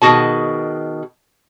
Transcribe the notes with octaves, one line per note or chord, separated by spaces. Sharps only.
B2 D#3 F#4 G#4 A5